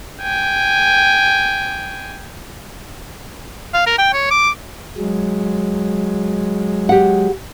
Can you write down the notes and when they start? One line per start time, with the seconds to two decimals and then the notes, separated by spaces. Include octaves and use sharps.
0.22 G5 G#5
3.74 F5
3.87 A#4
3.98 G5
4.13 C#5
4.31 D6
4.97 F#3 G#3
6.89 G4 F#5